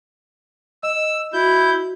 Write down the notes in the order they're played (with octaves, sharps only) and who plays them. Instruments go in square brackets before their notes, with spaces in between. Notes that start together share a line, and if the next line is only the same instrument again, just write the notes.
[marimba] D#5 [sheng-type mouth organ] E6
[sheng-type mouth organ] E4 G6 [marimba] F#4